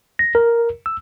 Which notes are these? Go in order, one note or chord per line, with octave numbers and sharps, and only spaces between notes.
A#6
A#4
E6